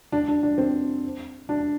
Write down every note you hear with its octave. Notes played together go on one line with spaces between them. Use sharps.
D4
D4
D4
C4
D4